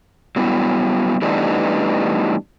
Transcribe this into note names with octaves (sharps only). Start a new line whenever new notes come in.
F#3 G3 B3 E4
E3 G3 A3 B3 D4 D#4